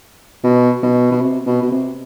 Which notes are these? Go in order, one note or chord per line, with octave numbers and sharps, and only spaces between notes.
B2
B2
B2
C3
B2
B2
C3